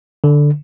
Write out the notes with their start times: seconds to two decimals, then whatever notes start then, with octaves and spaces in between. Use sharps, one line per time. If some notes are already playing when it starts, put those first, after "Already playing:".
0.24 D3